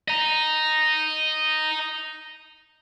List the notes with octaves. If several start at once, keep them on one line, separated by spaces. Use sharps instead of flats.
D#5 A#5